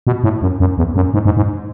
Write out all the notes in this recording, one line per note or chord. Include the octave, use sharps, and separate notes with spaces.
B2
A2
F#2
F#2
E2
F#2
G#2
G#2
G#2